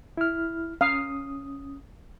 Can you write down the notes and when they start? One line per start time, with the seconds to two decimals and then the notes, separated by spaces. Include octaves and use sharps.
0.17 E4 F6
0.81 C#4 F5 D#6